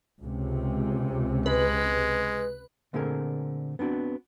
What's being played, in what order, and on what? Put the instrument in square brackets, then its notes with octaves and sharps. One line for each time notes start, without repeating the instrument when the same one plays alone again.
[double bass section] C#2 C3
[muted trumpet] G#3 [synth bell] B4
[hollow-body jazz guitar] A#2 D3 A3 C4 G#4 A#4
B3 C4 D4 F#4